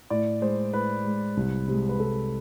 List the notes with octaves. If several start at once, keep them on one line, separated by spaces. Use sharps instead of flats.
A2 D5
G#3 C5
A2 B4
G#3
C2
C3 G#3
B4
C2 A4